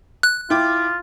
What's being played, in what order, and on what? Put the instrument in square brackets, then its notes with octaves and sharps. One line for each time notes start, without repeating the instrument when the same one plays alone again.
[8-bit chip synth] F#6
[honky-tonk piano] E4 G5 D6 [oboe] F4